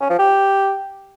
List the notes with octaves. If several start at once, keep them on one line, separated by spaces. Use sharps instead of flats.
C#4
F3
G4